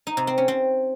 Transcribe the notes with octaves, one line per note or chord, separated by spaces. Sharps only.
D#4
C3
C4
C#4
C4